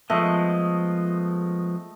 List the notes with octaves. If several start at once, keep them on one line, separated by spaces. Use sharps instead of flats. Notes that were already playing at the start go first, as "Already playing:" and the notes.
F3 G#3 A3 B3 D#5